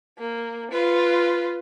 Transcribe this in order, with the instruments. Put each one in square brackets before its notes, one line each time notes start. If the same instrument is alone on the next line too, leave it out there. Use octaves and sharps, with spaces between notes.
[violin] A#3
F4 B4